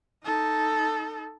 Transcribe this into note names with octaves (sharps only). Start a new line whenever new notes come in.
D#4 A4